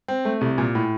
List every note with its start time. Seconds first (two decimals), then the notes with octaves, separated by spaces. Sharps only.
0.08 C4
0.25 A3
0.41 C2
0.58 A#2
0.75 A2